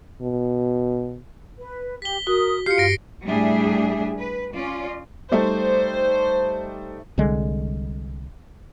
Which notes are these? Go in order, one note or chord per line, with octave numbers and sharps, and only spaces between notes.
B2
B4
G4 B6 G7
F#4 A#4 D#6
F4 G4 F5 F6 C7 C#7
G2 A#6 D7
A2 G3 D4 G#4 E5
B4
C#4 F4 D5
G3 A3 D#4 C5
C2 D3 G3 G#3